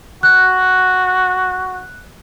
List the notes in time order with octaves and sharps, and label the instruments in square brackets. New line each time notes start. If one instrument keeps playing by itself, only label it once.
[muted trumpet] F#4 [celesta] F#6